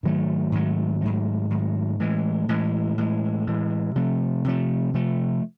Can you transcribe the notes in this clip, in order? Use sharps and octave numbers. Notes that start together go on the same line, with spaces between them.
G#2 D#3 F#3 A3
G#2 D#3 F#3 A3
G#2 D#3 F#3 A3
G#2 D#3 F#3 A3
A2 E3 G#3
A2 E3 G#3
A2 E3 G#3
A2 E3 G#3
C3 F3 A3
C3 F3 A3
C3 F3 A3